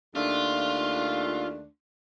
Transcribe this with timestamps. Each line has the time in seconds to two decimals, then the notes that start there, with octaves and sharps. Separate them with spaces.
0.15 D#2 A3 D4 F4